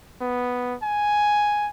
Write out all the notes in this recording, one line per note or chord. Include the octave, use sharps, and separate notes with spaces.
B3
G#5